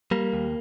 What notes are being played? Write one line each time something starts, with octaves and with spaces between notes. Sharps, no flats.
G3 A#3
D#2